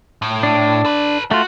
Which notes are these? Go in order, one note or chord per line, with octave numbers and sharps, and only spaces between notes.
A2
D4
A4 B4
A3 F4 F#4